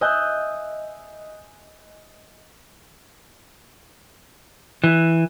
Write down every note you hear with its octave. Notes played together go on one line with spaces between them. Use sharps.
D#5 E5 G#5 E6 F#6 G6
E3